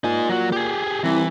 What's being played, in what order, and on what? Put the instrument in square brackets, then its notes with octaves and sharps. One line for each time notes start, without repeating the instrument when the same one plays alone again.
[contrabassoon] A#2 [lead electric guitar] D#4 G#5
[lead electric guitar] F#3 F#4
G4 G#4
[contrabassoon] C2 [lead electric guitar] E3